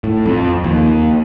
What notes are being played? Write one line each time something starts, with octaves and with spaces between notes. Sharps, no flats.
A2
F2
D#2